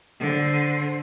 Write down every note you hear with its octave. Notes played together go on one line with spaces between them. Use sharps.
D3 C5